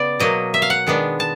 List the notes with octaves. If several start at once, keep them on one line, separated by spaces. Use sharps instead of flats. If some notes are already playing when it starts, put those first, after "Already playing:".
Already playing: C#3 B3 D5
B2 F#3 A#3 D#5
E5
F5
F#5
D#3 G#3 B3 D4
A5